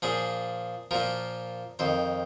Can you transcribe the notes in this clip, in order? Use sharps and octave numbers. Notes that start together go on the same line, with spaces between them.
A#2 F3 G#4
A#2 F3 A#4
F2 D#3 C5